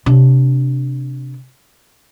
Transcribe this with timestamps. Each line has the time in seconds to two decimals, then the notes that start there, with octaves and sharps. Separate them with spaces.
0.06 C3 D4